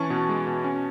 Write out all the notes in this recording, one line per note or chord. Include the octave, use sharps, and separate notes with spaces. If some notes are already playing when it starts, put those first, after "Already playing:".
Already playing: E3 C#4 A5 C#6
B2
G#3
B2
C#4